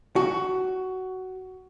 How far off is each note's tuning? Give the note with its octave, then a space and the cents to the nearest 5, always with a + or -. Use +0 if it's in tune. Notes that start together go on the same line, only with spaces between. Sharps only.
F#4 +15